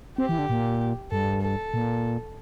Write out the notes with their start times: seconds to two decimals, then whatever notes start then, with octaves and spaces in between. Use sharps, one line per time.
0.18 C4 G4
0.29 E3
0.39 D3
0.50 A#2
1.11 G2 A4
1.42 A4
1.74 A#2